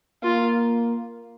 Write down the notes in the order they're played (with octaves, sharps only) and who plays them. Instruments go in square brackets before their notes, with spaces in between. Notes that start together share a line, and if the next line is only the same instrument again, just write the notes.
[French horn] A#3 [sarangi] F4